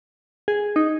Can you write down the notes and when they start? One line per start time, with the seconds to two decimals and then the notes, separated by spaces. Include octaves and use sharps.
0.48 G#4
0.76 D#4